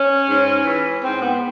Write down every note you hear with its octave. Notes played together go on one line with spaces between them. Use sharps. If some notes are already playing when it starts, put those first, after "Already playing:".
Already playing: C#4
G#2
E3
G#2 C4
B3